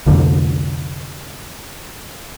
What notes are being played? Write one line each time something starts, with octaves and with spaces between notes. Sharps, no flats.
C2 F2 D3